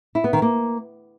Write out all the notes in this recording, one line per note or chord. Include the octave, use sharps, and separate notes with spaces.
E4
B3
D#3
A#3